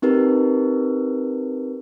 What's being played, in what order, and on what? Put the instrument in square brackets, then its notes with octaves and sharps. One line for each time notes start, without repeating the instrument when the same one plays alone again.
[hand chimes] C4 D#4 G4 A#4 B4